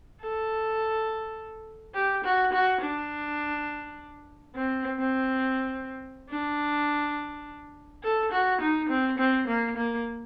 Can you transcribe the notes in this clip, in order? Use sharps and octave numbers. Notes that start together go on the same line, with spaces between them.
A4
G4
F#4
F#4
D4
C4
C4
D4
A4
F#4
D#4
C4
C4
A#3
A#3